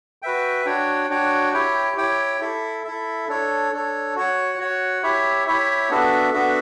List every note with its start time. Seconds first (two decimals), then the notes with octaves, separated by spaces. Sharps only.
0.22 F#4 B4 E5 G5
0.66 D4 F#4 C#5 G5
1.10 D4 F#4 C#5 G5
1.53 E4 G4 C#5 G5
1.97 E4 G4 C#5 G5
2.41 E4 A4 E5
2.85 E4 A4 E5
3.28 D4 A4 C#5
3.72 D4 A4 C#5
4.15 F#4 C#5 F#5
4.59 F#4 C#5 F#5
5.03 E4 G4 C#5 E5
5.47 E4 G4 C#5 E5
5.90 B3 D4 F#4 A4 E5
6.33 B3 D4 F#4 A4 E5